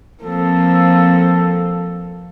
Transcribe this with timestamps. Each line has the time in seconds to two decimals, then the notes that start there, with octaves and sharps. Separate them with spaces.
0.22 F3 A#3 C4 A4